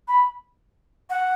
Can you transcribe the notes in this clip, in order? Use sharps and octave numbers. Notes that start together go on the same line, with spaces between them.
B5
F#5